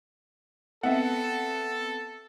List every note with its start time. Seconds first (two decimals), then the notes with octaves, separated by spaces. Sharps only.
0.83 B3 C4 A4 E5 F#5